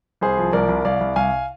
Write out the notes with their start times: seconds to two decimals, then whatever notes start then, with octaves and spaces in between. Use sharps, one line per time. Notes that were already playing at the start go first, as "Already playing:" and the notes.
0.21 C2 G#4 C5
0.38 F3
0.53 C2 A#4 D5
0.69 C2
0.85 C2 D5 F5
1.00 C2
1.16 C2 F5 G#5